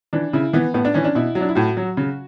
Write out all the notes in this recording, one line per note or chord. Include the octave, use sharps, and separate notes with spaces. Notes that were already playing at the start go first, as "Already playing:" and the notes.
E3 D4
C#3 E4
E3 B3
A2 B3
D4
E3 C#4
D4
B2 E4
F#3
D4
E4
A2 F#4
F#3
C#3